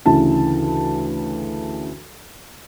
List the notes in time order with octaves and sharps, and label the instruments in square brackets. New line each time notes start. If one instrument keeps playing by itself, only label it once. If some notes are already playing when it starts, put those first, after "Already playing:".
[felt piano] D2 C#3 E3 A5